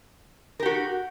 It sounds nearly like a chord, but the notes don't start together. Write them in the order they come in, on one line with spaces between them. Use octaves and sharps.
A#4 G4 F#4